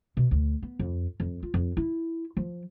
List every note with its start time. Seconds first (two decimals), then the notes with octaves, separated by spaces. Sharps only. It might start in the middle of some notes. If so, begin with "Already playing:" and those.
0.17 B2
0.31 D2
0.62 B3
0.79 F2
1.20 F2
1.43 F4
1.54 F2
1.77 E4
2.37 F3